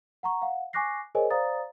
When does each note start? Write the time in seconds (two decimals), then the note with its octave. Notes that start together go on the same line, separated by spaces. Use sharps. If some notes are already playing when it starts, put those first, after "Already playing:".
0.23 F#5 A#5 C#6
0.42 F5 F#5
0.73 G#5 C#6 D6 F#6 A#6 C7
1.15 G#4 A#4 C5 C#5 D#5 G#5
1.30 C5 D5 F5 A#5 D#6 A6